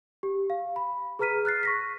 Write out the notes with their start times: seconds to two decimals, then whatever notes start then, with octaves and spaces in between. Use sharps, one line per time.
0.23 G4
0.50 F5
0.76 B5
1.19 G#4 B4 A#5 F6 B6 D#7
1.45 F6 F#6 A6 C7
1.63 C#6 A#6 B6